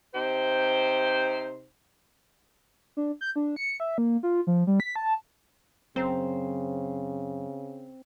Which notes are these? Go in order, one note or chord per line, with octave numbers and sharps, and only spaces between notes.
C3 D#4 G4 C5
D4
G6
D4
C#7
E5
A#3
F4
F3
G3
B6
A5
F#2 C#3 C4 C5 A#5